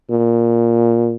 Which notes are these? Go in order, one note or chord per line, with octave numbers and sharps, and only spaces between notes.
A#2